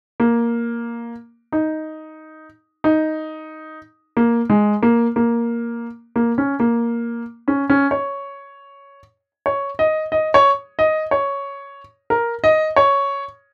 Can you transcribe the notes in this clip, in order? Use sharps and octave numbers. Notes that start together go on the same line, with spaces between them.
A#3
D#4
D#4
A#3
G#3
A#3
A#3
A#3
C#4
A#3
C#4
C#4
C#5
C#5
D#5
D#5
C#5
D#5
C#5
A#4
D#5
C#5